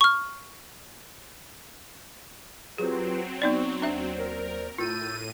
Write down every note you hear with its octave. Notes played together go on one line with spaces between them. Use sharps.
C#6 F6
F#3 C4 F4 G4 G#4 B4
B3 D#4 D5 C#6
D#2 D4 C5 D5 E5
A#4
A2 F4 E6 G6 A6 D#7